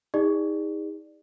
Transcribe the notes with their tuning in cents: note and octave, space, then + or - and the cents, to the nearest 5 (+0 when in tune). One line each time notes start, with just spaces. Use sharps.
D#4 +30 G#4 -35 D5 +20